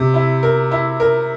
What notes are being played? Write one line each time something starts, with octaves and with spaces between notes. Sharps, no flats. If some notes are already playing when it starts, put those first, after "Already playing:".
Already playing: C3
E4
A#4
E4
A#4